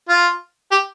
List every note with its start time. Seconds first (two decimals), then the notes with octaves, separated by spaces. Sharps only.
0.09 F4
0.71 G4